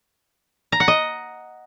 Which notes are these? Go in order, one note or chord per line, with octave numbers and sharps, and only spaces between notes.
A#5
F#5
D#5